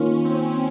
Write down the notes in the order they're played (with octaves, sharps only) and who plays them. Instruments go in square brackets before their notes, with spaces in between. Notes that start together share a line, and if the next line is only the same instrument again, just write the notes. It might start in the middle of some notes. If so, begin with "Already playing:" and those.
Already playing: [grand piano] D#3 A#3 F4 A#4 [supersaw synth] C#4
[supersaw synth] C4